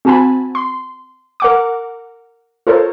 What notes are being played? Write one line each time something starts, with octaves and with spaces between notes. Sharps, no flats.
C4 F#4 G#5 A5 B5
C6
A#4 F#5 D6
F4 A4 A#4 C5 C#5